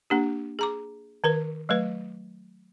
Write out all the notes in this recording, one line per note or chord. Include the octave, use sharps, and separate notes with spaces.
A#3 D4 G4
G#4 A#5 D6
D#3 A#4 B4
F#3 A3 B4